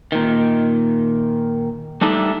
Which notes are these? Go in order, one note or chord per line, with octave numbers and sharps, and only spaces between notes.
A#2 D#3
G3 A3 D4 D#4 A4